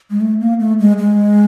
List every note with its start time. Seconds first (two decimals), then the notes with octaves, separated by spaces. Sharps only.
0.10 G#3
0.21 A3
0.40 A#3
0.60 A3
0.79 G#3
0.99 G#3